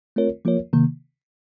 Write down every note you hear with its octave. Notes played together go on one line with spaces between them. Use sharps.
A3 C4 F4 A#4 C#5
F3 A#3 F4 A#4 C#5
C3 D#3 A#3